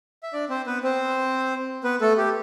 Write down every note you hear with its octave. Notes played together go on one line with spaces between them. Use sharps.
E5
D4 D5
C4 C5
B3 B4
C4 C5
B3 B4
A3 A4
G4